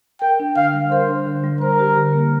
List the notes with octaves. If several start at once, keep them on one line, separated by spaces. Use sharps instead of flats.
A#4 G5
D4
D3 F5
G3
A#4 C5
D4
D3
G3
A#4 C5
G4
D3
A#3